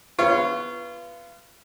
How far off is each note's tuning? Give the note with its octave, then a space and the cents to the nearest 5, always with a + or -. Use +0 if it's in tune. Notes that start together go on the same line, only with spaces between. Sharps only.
B3 -5 F4 -30 C#5 +0